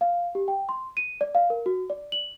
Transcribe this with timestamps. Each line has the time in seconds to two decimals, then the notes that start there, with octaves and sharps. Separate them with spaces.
0.01 F5
0.35 G4
0.48 G5
0.69 C6
0.97 D#7
1.21 D5
1.35 F5
1.50 A#4
1.66 F#4
1.90 D5
2.12 F#7